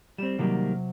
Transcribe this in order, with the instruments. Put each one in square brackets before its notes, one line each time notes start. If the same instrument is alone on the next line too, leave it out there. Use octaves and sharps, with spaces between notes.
[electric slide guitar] G3 C4 [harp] E7
[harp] C3 F#3 [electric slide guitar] D#3 G3 A#3